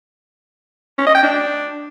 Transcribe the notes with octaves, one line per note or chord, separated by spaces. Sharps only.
C#4
D#5
G5
D4